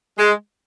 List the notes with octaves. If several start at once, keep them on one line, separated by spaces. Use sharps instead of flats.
G#3